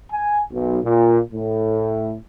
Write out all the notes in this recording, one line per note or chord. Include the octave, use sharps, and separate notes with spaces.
G#5
B1
A#2
A2